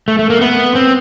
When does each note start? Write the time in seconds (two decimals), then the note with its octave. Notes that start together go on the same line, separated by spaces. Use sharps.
0.08 A3
0.19 A3
0.30 A#3
0.41 B3
0.75 C4